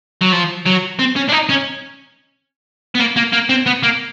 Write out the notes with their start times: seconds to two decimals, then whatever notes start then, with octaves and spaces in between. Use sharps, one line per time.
0.22 F#3
0.33 F3
0.66 F#3
0.99 C4
1.16 C#4
1.29 D4
1.32 D#4
1.49 C#4
2.95 B3
2.99 A#3
3.16 A#3
3.32 A#3
3.49 C4
3.66 B3
3.83 A#3